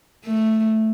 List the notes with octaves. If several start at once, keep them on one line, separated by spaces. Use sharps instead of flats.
A3